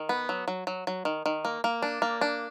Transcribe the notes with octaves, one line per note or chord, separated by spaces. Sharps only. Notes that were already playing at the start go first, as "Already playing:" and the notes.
Already playing: D#3
B3
F#3
F#3
F#3
F#3
D#3
D#3
A#3
A#3
D4
A#3
D4